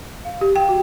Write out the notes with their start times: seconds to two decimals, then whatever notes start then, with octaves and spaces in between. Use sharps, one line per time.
0.25 F5
0.41 G4
0.56 G5
0.69 F#4